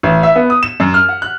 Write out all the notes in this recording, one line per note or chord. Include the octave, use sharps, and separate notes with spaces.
A1
E5
B3
D#6
E7
F#2
F6
F#5
F#6